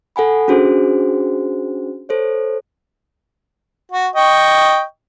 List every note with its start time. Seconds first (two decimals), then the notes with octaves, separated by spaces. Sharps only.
0.16 A4 F#5 G#5 B5
0.48 C#4 D4 F#4 G#4 C5
2.09 A4 C5 C#5
3.92 F#4
4.15 D#5 G5 C#6